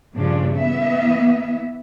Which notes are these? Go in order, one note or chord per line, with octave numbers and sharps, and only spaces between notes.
G2 A#2 C#3 F3 D4
E3 A#3 B3 E5